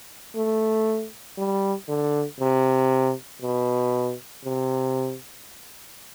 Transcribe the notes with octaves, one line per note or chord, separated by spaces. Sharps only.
A3
G3
D3
C3
B2
C3